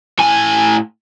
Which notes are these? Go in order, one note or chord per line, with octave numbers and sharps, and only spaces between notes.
A2 G#5